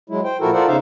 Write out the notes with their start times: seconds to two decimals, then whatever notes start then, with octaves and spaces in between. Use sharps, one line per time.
0.10 F#3 G#3 E4
0.24 C5 G5
0.41 A#2 F3 E4 F#4 A4 A#4
0.53 F4 A4 A#4 C5 D5 F#5
0.67 E2 C#3 D#4 C5 E5 F5